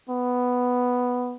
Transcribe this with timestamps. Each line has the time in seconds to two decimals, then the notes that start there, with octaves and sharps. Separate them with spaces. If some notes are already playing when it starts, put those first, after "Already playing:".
0.09 B3